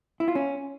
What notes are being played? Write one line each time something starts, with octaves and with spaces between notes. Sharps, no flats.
E4
F4
C#4